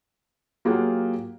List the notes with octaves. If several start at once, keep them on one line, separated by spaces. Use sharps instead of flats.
F#3 A#3 F4 G4 G#4 F#5